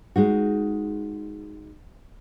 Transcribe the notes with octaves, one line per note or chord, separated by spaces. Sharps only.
G#3 D#4 F#4